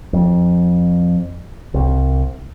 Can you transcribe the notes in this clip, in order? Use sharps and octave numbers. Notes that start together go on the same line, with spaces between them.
F2
C2